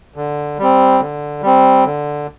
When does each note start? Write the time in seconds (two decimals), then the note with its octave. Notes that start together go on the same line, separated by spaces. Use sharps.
0.16 D3
0.59 G3 C4
1.00 D3
1.42 G3 C4
1.85 D3